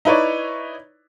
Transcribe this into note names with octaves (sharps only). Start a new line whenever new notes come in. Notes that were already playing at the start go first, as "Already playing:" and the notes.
D#4 E4 B4 C#5 D5